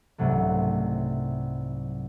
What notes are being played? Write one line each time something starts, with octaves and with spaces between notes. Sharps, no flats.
C2 G#2 C3 F#3 A3